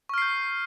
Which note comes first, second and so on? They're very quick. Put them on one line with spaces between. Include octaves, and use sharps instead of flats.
C#6 F6 C7 G6